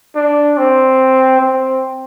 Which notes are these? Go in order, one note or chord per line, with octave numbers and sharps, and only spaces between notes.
D4
C4
C4